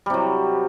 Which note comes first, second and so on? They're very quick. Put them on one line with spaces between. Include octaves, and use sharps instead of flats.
G3 C3 F#3